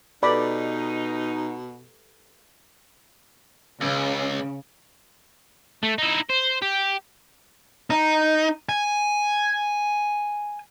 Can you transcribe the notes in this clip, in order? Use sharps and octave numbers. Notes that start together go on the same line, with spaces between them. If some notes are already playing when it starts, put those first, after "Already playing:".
B2 D#4 G4 A4 B4 D5 B5 D6
C#2 C#3
A3
D#4 E4
C5
G4
D#4
G#5